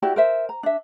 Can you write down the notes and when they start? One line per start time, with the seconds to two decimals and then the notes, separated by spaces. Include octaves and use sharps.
0.02 E4 F#4 G4 D5
0.16 A#4 C5 E5
0.49 A#5
0.63 D4 E5